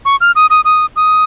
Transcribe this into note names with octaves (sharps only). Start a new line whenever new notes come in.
C#6
F6
D#6
D#6
D#6
D#6